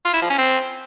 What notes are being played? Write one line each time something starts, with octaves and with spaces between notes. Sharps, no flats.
F4
E4
F3
C#4
C4